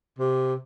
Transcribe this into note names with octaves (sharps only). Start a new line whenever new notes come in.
C3